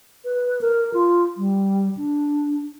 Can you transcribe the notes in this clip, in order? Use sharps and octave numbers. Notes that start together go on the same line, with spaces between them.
B4
A#4
F4
G3
D4